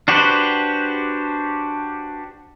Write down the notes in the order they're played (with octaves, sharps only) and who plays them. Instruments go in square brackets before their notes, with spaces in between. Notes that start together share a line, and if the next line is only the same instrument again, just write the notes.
[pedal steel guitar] D4 F#4 G4 B4 C5